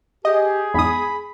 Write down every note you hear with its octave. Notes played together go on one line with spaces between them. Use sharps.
G4 G#4 D#5
E2 G#2 B5 D#6